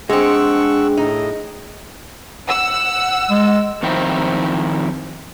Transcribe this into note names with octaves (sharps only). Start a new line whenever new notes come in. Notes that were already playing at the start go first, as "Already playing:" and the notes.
G#3 C4 D4 G#4 F#5 G5 C#6 E6
A2 D#4 D#5
F#5 E6
G#3
F2 D#3 C4 E4